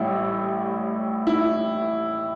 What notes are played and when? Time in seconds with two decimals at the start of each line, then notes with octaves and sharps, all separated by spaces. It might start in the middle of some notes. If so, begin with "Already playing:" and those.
Already playing: A1 A2 G3 E4
1.27 E4